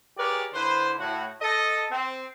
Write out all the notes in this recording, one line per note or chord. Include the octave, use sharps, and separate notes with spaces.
G4 G#4 A#4 B4 C#5 D5
D3 E4 B4 C5
A2 F#4
A4 D#5
C4